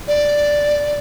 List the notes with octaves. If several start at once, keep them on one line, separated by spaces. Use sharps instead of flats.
D5